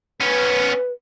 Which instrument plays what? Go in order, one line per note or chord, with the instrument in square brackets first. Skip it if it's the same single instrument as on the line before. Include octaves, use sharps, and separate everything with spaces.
[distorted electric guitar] B3 C#4 [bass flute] B4